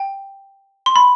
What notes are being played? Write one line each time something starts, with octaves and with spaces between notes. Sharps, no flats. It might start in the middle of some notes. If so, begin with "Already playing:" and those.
Already playing: G5
C6
B5